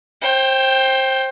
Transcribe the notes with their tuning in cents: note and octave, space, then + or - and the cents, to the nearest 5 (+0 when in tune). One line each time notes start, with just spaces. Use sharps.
C5 +25 G5 +0